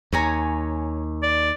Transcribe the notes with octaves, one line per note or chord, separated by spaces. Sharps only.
D#2 C#5 G#5 A#5
D5